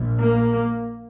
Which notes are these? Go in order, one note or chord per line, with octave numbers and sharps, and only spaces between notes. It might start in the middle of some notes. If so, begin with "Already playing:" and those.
Already playing: A#1 A#2
A#3